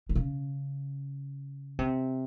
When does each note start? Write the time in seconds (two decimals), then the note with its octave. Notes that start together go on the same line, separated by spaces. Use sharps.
0.09 D3
0.15 C#3
1.79 C3